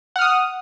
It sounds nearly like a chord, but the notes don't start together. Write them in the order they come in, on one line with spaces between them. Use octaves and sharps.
F#5 F6 D#6